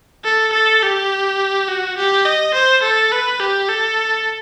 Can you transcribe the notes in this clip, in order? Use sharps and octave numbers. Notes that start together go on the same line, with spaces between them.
A4
A4
G4
F#4
G4
D#5
C5
A4
B4
G4
A4